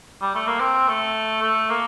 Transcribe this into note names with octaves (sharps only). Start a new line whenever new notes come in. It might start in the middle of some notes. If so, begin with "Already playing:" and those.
G3
A3
A#3
C4
A3
A3
A#3